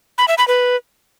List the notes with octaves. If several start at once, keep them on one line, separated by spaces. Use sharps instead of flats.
B5
E5
B5
B4